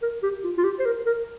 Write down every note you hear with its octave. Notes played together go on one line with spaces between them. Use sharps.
A#4
G4
F4
F4
G4
C5
A#4
A#4